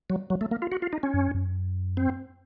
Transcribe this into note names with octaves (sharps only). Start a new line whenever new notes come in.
F#3
F#3
A3
A#3
F4
F#4
F4
D#4
C#4
F#2
F#2
C4